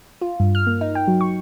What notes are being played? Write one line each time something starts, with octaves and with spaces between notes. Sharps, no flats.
F4
G2
F6
A#3
D#4
G5
F#3
C#6